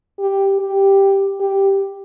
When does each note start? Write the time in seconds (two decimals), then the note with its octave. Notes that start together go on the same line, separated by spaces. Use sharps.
0.19 G4
0.59 G4
1.40 G4